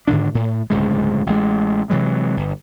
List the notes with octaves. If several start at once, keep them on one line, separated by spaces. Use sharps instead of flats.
G#2 D3 D#3 D4
A2
D1 C#2 G2 G#3
A1 G#3
C3 E3 F#3 G#3
G1